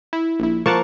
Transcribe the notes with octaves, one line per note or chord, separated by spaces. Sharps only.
E4
A#1 E4
F3 A#3 A#4 F#5 A5 C#6